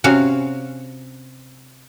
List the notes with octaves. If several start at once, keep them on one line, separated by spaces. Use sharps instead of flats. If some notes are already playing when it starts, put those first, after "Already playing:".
C3 C#4 F#4 F5